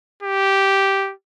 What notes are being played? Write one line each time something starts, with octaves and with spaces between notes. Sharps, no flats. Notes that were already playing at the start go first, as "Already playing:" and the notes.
G4